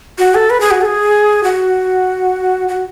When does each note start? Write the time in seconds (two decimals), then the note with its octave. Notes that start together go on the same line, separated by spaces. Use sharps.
0.19 F#4
0.35 A4
0.50 B4
0.61 G#4
0.71 F#4
0.81 A4
0.85 G#4
1.44 F#4
2.68 F#4